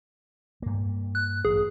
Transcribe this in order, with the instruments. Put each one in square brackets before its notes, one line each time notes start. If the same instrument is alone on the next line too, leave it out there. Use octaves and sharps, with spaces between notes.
[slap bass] G2 A#3
[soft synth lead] F#6
[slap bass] A1 [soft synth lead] G#4